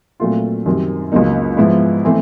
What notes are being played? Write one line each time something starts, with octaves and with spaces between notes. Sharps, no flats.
A#2 F#3 A3 C4 F4
F#2 D#3 G3 C4
C#2 C#3 F#3 A#3 D#4
G#2 F3 G#3 B3 E4
E3 A3 C4